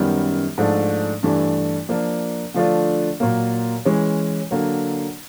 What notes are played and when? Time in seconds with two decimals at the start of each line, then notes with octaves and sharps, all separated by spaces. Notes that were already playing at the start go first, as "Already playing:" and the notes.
Already playing: F#2 D#3 G3 B3
0.58 G#2 F3 A3 D4
1.23 G2 E3 A3 D4
1.89 F3 A#3 D4
2.54 D3 F3 A3 D4 F4
3.20 A#2 F#3 A#3
3.85 E3 G#3 C#4
4.51 D3 F#3 A#3